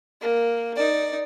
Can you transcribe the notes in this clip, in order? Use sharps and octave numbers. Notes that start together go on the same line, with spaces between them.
A#3
D#4 D5